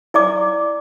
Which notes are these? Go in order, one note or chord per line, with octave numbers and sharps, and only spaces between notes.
E4 D5 D6